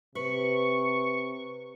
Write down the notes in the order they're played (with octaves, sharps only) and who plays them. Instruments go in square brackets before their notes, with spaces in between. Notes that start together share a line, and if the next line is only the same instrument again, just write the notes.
[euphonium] C3 [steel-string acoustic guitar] B4 [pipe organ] C#6